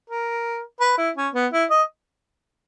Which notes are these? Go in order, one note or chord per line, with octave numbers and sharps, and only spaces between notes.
A#4
B4
E4
C#4
B3
E4
D#5